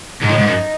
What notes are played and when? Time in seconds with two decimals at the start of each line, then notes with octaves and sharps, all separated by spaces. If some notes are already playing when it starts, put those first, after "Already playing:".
0.22 G#2 D#4
0.29 A2
0.38 G#2
0.47 F#2